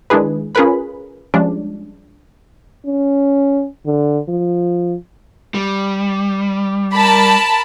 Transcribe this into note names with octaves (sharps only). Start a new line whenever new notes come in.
D#3 G#3 D4 E4 G#4 B4
C#4 F4 G#4 A#4 B4 B5
F3 G3 G#3 C#4 D4
C#4
D3
F3
G3
A#4 A5 B5